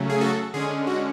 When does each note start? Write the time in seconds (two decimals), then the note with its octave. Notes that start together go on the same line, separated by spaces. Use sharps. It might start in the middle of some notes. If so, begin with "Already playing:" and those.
Already playing: C#3 F#3 A3 C#4
0.09 G#4
0.21 F#4 A4
0.54 D3 G#3 C#4 G#4
0.87 F#4